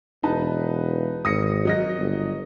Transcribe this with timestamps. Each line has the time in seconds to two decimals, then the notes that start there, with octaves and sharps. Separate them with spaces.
0.23 E1 D#4 B4 A5
1.25 G#1 D#6 A#6 C#7
1.65 F#3 D#5 A#6
1.98 G1